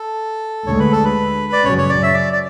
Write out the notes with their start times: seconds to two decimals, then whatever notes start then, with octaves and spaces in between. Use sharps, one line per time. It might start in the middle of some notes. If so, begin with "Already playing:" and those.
Already playing: A4
0.67 D2 D3 G#3 C#5
0.79 B4
0.92 A4
1.05 B4
1.53 D5
1.65 F#2 C#3 F#3 C#4 C#5
1.78 C#5
1.89 D5
2.03 E5
2.14 D5
2.33 D5